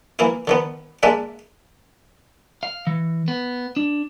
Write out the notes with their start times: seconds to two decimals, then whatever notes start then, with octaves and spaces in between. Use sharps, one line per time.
0.19 E3 A#3 E4
0.47 D3 D#3 B3
1.03 G#3 A#3 D4 D5 E5
2.63 F5
2.87 E3
3.28 B3
3.76 D4